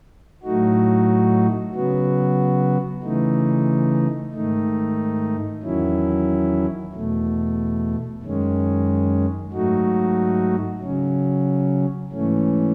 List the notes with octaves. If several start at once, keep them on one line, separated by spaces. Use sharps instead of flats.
A2 F#3 A3 D#4 F#4
C#3 F#3 B3 F#4
C#3 E3 A3 D#4
G#2 D#3 A3 D#4
E2 D#3 F#3 C#4 E4
E2 B2 A3
F#2 D#3 G#3 C#4
G#2 F#3 A3 D#4 F#4
C#3 F#3 C#4
G#2 E3 A3 C#4